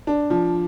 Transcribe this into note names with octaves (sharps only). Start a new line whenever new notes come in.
D4
F3